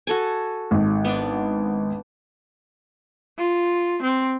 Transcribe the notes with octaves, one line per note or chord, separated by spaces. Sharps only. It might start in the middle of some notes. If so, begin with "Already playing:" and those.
F#4 A4 G#5
G#1
B3 D4
F4
C4